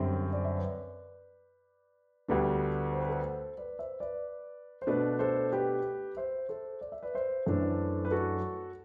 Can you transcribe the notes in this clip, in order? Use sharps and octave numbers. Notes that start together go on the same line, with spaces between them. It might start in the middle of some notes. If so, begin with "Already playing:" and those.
Already playing: F#2 D3 G3 C4 C5 E5
D5
E5
B4 D5
D2 D3 G3 B3 D4
C5
B4
A4 C5
B4 D5
C5 E5
B4 D5
C5
B2 A3 D4 B4 D5
A4 C5
G4 B4
C5 E5
A4 C5
D5
E5
B4 D5
C5 E5
F#2 E3 A3 D4 A4 C5
B4
F#4 A4